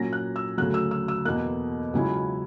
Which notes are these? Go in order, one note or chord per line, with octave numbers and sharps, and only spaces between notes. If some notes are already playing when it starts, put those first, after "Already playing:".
Already playing: A#2 F#3 C#4 A#6
F#6
E6
D2 C#3 F#3 F#6
E6
E6
E6
E2 B2 A#3 F#6
C#2 C#3 F#3 C#4 E4